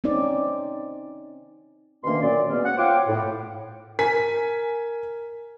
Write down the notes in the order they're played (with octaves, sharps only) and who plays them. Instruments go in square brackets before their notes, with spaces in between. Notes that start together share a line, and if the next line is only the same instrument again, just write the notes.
[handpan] C4 C#4 D#4 D5
[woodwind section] D2 B2 D#3 A#3 C#4 C6
F#2 A#2 D5
B2 G#3 A#3 B3 C#4
F#5
F4 C5 C#5 F5 G5 D6
A2
[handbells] A#4 [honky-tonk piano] G#5 B6